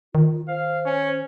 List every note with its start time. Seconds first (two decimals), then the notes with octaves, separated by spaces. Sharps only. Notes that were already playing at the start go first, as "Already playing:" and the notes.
0.15 D#3 F4
0.48 C5 F5
0.86 C#4